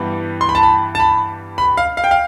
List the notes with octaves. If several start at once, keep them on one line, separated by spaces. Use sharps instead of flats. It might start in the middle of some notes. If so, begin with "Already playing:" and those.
Already playing: G2 E3 G3 B3
C6
B5
A5
B5
A5
B5
B5
F5
F5
G5
F5